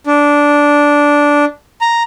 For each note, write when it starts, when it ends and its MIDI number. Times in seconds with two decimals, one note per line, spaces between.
0.07 1.45 62
1.81 2.03 82